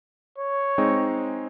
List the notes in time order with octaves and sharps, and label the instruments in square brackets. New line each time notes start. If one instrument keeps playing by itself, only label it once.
[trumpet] C#5
[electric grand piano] G#3 C4 D#4